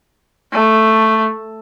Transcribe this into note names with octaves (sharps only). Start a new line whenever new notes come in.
A3